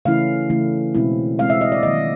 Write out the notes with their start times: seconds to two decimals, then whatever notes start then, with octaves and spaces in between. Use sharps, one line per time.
0.05 C#3 E3 A3 C#4 E4 F5
0.50 C#3 E3 A3 C#4 E4
0.95 B2 G#3 C4 E4
1.38 B2 G#3 C4 E4 F5
1.50 E5
1.61 D#5
1.72 D5
1.83 D#3 F#3 A#3 D#5